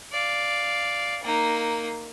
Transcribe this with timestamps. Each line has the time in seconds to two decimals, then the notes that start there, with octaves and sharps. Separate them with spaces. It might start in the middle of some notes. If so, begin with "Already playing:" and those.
0.12 D5 F5
1.24 A#3 D#4